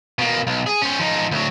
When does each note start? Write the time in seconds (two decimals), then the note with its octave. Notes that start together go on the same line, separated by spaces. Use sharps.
0.19 B2 A#3
0.47 B1
0.67 G#4
0.82 C#4 C5
1.00 F3 D#4
1.31 D2 F#3